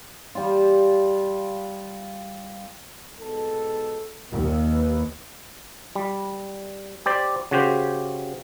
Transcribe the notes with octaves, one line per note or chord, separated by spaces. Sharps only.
G3 F4
G#2 B2 A4
D#2 A#2
B4
G3
G4 C5 D5
C#3 F#4 G4 C5